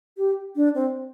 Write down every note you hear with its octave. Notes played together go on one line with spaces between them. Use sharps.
G4
D4
C4